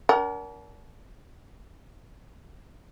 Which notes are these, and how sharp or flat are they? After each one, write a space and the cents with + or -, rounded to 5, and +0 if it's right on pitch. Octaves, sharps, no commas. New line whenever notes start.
D4 -40 A#4 +15 F#5 +30